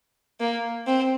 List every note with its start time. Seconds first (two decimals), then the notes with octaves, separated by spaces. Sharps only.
0.40 A#3
0.87 C4